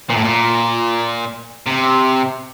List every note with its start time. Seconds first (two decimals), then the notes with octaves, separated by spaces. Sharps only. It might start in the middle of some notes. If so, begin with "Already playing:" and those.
0.10 A#2
0.16 A2
0.24 A#2
1.66 C3